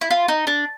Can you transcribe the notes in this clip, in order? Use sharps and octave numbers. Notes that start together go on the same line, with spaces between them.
E4
F4
D#4
D4